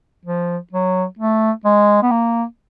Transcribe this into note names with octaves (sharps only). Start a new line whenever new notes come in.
F3
F#3
A3
G#3
B3
A#3